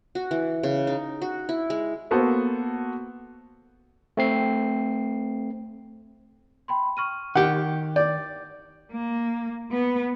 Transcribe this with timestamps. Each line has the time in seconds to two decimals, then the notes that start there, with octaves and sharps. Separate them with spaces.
0.15 F#4
0.31 E3
0.63 C#3
0.87 D#4
1.22 F#4
1.49 E4
1.70 G#3
2.11 A#3 B3 F#4 A4 C5
4.17 A3 C4 C7
6.68 G5 B5 C6
6.97 C#6 F6 D#7
7.35 D#3 G4 F#5
7.96 D5 G6
8.91 A#3
9.72 B3